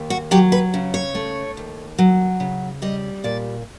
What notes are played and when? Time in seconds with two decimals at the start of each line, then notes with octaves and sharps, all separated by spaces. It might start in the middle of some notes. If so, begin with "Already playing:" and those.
Already playing: D#2
0.10 F#4
0.31 F#3 G4
0.52 B4
0.74 C#3
0.94 C#5
1.15 A3
1.57 D#2
1.98 F#3
2.40 C#3
2.82 G3 D#5
3.24 A#2 D5